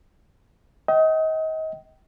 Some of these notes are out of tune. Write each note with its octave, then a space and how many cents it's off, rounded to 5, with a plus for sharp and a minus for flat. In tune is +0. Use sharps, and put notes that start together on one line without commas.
D#5 +30 G5 -30